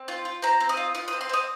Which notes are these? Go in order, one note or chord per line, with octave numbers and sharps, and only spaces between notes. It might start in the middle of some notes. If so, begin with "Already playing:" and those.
Already playing: C4
F4
F4
C4 A#5
C4
D#6
F4
F4 D#6
C4 D#6
C6
C4 D#6